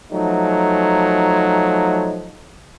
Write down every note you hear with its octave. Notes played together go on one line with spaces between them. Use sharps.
F3 F#3 A3 D#4